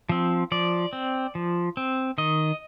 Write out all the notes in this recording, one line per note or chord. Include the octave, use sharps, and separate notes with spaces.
F3 C4
F3 D5
C4
F3
C4
D#3 D#5